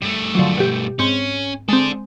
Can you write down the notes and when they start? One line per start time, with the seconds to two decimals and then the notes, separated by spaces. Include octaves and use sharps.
0.02 G2 A3
0.35 D3 F3 F#3
0.58 B2 G4
0.99 G#2 C4 C#4
1.69 G#3 C4 D4 A4